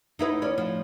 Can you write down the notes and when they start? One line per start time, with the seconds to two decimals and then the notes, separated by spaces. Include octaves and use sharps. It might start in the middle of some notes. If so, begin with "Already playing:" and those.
0.19 D#4 E4 B4
0.42 D2 C#4 D5
0.58 F3